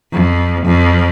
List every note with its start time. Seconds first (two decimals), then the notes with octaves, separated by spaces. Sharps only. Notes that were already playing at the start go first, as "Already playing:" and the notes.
0.13 F2
0.66 F2